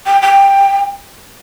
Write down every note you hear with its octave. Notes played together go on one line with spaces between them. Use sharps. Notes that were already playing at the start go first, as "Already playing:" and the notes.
G5
G5